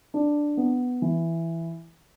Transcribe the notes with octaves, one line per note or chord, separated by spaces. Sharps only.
D4
B3
E3